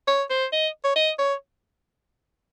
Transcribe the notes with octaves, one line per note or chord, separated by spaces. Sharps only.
C#5
C5
D#5
C#5
D#5
C#5